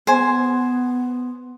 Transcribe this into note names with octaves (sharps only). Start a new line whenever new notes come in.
B3 C5 G#5